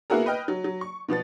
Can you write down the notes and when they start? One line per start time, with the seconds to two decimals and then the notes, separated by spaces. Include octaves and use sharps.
0.10 A#3 B3 E4 F#4 G#4 A#4
0.26 B4 D#5 G5 F6
0.48 F#3
0.64 F#3
0.81 C#6
1.08 B2 F3 B3 A6